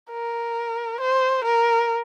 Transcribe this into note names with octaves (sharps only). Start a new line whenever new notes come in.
A#4
C5
A#4